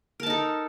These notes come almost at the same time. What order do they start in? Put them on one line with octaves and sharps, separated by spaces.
A#4 A5 D#4 A4